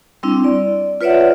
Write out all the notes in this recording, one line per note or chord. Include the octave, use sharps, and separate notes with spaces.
G3 C4 D4 E4
D5
F4 B4 C#5 D5 E5 F#5